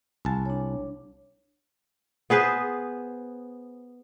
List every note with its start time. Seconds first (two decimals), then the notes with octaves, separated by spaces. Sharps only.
0.25 C2 G#5 A5
0.46 D4 C#5
2.30 B3 G#4 B4 C5